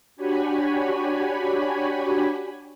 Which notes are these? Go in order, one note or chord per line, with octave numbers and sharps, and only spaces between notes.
D4 F#4 G4 C#5 G#5 B5